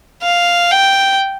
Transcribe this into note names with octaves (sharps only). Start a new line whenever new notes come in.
F5
G5